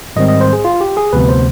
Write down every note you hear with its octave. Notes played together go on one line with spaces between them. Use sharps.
G#2 D#3 G3 C4 D#5
D#5
C5
G#4
F4
G4
G#4
D2 C3 F3 B3 B4
C5